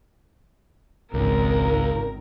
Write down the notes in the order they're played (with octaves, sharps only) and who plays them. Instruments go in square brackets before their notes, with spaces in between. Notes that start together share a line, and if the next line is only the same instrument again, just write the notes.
[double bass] G#1 [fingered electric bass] C#2 [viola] A#4